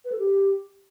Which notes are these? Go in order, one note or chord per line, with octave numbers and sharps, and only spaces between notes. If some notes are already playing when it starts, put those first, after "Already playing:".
B4
A4
G4